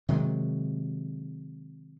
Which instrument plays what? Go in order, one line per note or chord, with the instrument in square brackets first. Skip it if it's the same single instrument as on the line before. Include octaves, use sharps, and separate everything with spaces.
[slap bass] C3 D#3 F#3 G#3